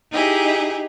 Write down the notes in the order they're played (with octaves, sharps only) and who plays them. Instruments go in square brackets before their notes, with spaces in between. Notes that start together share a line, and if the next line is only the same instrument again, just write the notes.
[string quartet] D#4 E4 G4 G#4